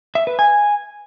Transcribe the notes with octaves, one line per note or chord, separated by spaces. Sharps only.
E5
B4
G#5